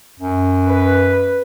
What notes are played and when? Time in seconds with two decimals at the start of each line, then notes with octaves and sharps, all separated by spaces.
0.20 F#2
0.68 B4